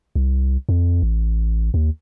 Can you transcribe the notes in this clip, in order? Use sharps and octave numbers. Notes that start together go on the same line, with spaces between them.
C2
F2
A1
D#2